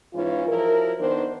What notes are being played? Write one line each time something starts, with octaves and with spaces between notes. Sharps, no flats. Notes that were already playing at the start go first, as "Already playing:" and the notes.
G#2 E3 C#4 F4
F3 F#3 E4 A#4
D#3 B3 D4 C5